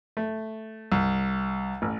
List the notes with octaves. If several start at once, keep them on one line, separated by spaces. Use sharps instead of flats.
A3
C2
A1